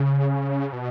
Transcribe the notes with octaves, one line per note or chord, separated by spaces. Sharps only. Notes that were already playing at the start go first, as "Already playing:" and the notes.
Already playing: C#3
B2